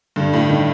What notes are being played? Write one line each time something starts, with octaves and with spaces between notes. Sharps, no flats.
G2 D3
A2
D#3